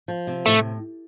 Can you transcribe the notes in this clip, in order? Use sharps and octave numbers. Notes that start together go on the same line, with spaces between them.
F3
C3
A2 A3